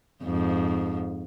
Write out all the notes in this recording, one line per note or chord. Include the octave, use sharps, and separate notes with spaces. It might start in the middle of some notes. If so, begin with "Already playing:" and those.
F2 G#2